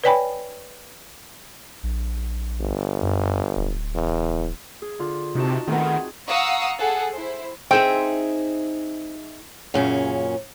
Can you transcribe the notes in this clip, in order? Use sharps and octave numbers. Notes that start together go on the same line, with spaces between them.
B4 C#5 D5 G5 G#5 B5
A#1
G1
F#2
D1
E2
G#4
D3 F4
C3 D#4 F#4 A5
D#3 A3 B3 C4
G#4
F5 F#5 A#5 C#6 D#6 E6
G#4 A4 F#5
E4 C5
C4 D#4 G#4 E5 G5
F#2 A#2 C#3 C#4